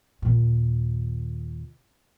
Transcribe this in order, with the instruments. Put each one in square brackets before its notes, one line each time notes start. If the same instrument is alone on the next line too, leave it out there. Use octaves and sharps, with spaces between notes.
[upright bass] D#2 A#2